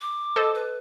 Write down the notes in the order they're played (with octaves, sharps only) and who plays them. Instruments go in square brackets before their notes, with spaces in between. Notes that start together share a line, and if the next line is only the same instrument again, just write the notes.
[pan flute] D6
[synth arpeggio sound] A4 C5 D#5
[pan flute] B4